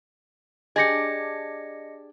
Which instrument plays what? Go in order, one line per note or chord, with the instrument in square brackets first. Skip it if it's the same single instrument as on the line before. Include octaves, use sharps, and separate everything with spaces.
[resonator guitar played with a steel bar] D4 G4 G#4 [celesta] D#5 A#6 C#7